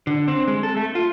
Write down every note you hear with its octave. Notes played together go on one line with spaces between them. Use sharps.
D3
C4
G#3
A4
A3
F4